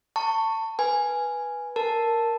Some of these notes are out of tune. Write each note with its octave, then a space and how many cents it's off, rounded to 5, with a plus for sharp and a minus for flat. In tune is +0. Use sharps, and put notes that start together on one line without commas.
A5 +25 C#6 +0
B4 -10 G#5 +0
A#4 +0 A5 +0